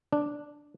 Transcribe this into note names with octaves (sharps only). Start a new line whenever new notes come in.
D4